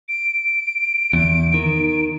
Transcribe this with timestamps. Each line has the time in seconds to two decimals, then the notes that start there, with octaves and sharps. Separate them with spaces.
0.09 D7
1.13 E2
1.54 D#3